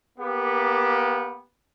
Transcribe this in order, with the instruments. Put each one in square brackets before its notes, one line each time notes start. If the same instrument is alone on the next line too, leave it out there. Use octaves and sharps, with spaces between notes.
[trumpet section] A#3 B3 G4